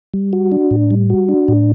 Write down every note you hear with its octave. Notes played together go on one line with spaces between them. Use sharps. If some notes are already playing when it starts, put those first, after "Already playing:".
G3
F#4
D4
A2
G3
F#4
D4
A2